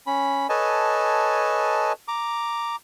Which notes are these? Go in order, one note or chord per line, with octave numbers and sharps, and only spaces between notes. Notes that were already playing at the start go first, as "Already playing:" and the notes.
C#4 B5
A4 B4 C#5 D#5 G#5 A5
A#5 D6